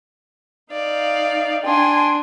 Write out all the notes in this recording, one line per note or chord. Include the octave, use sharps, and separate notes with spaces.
D#4 D5 F5
D4 G5 G#5 C6